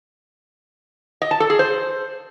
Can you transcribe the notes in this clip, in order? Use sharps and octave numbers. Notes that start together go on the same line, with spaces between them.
D#5
A5
A4
G#4
C5